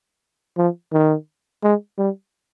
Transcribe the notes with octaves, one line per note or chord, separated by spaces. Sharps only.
F3
D#3
G#3
G3